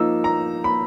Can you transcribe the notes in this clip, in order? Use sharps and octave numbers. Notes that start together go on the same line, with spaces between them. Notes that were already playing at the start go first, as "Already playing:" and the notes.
Already playing: F3 A#3 D#4 E6
A#5
B5